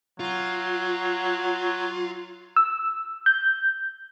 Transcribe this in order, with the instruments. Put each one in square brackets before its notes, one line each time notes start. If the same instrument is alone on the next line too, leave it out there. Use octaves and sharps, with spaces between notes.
[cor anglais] F#3 [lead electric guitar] F4
[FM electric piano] E6
G6